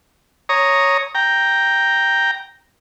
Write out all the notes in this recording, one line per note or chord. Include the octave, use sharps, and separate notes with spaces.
C#5 A#5 D#6
G5 A#5